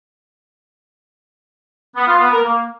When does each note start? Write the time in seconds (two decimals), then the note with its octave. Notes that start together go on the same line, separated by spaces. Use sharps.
1.96 B3
2.08 F4
2.19 B3
2.31 A#4
2.43 A#3